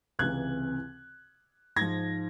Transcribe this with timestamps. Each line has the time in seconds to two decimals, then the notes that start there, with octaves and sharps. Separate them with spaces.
0.19 C#2 C3 E3 F#6 G#6
1.76 G#2 F3 G#6 A#6